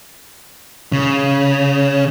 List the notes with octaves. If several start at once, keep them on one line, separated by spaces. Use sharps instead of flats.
C#3